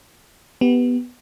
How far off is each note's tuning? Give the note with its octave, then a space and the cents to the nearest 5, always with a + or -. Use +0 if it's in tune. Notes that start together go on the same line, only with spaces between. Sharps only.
B3 +0 G4 +0